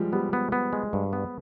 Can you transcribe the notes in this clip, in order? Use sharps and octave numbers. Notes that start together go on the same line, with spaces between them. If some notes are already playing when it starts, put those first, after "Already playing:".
Already playing: F3 G3 G#3
G3 B3
B3
B3
G#3
G2
B3